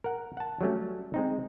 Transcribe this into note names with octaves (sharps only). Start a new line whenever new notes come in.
A#4 F#5
F#5 A5
F#3 G3 A3 C#4
G#3 C4 D#4